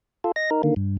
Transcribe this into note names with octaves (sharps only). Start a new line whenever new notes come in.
F4 A4
D#5 A#6
D#4 A#4
D3 D#3 A#3
G2